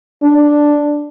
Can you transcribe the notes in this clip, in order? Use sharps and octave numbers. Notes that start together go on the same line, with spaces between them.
D4